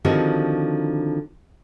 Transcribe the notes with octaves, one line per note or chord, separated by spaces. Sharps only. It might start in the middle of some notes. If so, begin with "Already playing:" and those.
D3 D#3 F3 C4 F#4 G4